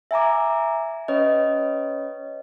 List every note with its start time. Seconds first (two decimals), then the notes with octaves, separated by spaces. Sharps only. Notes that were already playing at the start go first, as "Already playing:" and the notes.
0.11 E5 G#5 A#5 D6
1.08 C#4 B4 C#5 D#5